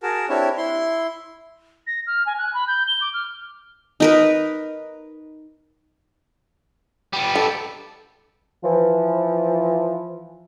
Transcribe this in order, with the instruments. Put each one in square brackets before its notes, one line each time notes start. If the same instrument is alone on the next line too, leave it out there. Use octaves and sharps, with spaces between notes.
[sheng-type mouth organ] F#4 G#4 A#4 A5
C4 D4 E4 G4 C#5
E4 C6
[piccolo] A#6
F6
G#5
F#6
B5
G6
G7
D6
F6
[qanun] D#4 A#4 B4
[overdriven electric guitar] G3 B3
[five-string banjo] A4
[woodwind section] E3 F3